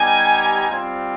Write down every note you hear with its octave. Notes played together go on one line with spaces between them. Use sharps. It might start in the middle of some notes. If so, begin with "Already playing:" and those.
Already playing: G3 B3 D#4 G4 G#5
G3 C4 F4